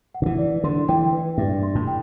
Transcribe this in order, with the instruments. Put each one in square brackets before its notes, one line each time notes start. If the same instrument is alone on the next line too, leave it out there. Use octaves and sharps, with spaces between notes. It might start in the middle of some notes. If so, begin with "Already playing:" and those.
[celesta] F#5
[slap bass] D3
E3
[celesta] D5
[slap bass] D3 [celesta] C6
[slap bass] E3 [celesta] G5
[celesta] B4
[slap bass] G2 [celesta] E5
[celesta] C6
[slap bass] A2
[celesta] G5